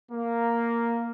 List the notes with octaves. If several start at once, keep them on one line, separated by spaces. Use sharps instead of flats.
A#3